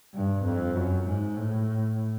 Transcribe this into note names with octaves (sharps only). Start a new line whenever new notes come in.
G2
F2
F#2
G#2
A2